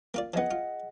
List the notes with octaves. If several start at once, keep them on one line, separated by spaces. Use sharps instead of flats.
A#3 F4 D5
F3 B3 G#4 D#5 F#5
F4